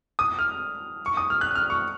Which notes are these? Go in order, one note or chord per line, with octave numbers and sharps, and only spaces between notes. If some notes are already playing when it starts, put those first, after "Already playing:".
D#6
F6
C#6
D#6
F6
F#6
F6
C#6